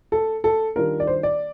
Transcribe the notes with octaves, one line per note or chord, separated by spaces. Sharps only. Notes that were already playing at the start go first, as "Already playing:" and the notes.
A4
A4
D#3 G3 D4 F4 A#4
D5
C5
D5